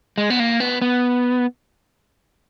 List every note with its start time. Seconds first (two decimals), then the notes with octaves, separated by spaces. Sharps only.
0.18 G#3
0.30 B3
0.40 A#3
0.60 B3
0.82 B3